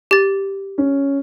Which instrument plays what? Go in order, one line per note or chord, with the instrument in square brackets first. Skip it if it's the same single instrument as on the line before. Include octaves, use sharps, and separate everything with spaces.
[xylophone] G4 A6
[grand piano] C#4